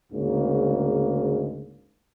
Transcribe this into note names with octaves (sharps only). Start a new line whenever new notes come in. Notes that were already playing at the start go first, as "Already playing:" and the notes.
D2 G#2 C#3 A#3